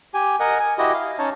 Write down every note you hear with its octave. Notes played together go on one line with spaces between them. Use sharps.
G4 G#5
A#4 D#5 F#5 G#5
G#5
E4 F#4 G4 D#5
F5
C#4 D#4 C#5 A5